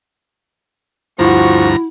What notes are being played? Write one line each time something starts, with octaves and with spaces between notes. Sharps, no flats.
D2 G2 F3 E4 F#4 A#5 C#6